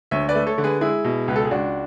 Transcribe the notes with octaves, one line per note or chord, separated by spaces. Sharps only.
D2 C#5 E5
B4 D5
A3
A4 C#5
D3
G#4 B4
G#3 E4 G#4
B2
C#2 B4
A4
G#4
C#2 D4 F#4